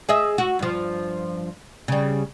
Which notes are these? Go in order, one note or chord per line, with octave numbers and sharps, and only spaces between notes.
G#4 D#5 E5
F#4
G2 F3
C#3 G3